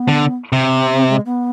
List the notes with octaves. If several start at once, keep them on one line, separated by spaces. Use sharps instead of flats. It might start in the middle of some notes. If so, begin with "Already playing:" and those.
Already playing: B3
D3
C3
C4
C4
G#3
B3